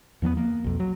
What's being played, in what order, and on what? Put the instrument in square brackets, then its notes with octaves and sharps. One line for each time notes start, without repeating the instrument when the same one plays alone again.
[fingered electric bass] E2 F3 A#3 B3
A#3
B1 F2
F#3